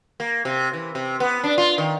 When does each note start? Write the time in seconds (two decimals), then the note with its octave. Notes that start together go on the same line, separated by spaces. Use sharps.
0.20 A#3
0.45 C3
0.73 E3
0.95 C3
1.20 B3
1.44 D4
1.58 F4
1.78 D#3